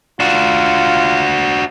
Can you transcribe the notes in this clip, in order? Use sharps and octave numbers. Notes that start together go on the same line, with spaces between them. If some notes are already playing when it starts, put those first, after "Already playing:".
D4 F4 F#4